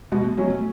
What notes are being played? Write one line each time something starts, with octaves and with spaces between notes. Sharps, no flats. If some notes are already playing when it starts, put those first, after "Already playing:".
B2 G#3
A3
F#3 A3 C#4
A3